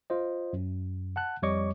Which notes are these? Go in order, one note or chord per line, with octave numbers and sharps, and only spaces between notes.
F4 C5 D#5
F#2
F#5 A5 F#6
F2 G3 C#5 D#5 C#6 D6